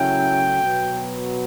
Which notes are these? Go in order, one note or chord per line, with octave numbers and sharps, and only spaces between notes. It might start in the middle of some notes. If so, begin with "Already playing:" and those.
Already playing: C#3 F#3 A3 C#4 E4 G5
B2 F#3 B3